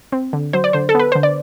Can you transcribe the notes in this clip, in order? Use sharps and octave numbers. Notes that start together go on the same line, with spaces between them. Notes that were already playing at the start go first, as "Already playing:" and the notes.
C4
D3
F#3 C5
D5
D3 C5
A4
B3 B4
D3 C5
D5